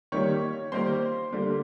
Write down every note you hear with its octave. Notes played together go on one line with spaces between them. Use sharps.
D#3 G3 A#3 C#5 C#6
D#3 G3 A#3 C5 C6
D3 G3 A#3